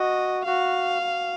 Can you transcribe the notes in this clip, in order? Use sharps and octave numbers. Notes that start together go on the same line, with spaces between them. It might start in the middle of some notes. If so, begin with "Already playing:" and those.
Already playing: F#4 D#5
F#4 F5
F#4